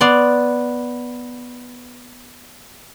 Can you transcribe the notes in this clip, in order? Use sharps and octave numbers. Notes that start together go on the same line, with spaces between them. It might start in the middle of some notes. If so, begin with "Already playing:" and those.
B3 D5 C6